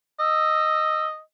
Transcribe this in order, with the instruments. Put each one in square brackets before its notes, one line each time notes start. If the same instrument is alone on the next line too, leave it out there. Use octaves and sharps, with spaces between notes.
[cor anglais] D#5 [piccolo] E6